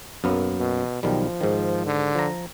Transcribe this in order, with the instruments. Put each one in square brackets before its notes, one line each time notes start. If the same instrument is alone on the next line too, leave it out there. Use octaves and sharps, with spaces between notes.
[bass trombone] B1 [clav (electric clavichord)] F#2 A#3 B3
[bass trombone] B2
[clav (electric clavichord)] B1 D#3 G3 [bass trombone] F3
[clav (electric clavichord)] G#2 D#3
[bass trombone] D3
[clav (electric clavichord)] F3 A#5